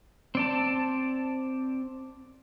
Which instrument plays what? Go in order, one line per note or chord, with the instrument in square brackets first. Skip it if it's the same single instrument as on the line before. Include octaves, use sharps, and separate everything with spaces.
[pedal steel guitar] C4 D5 A5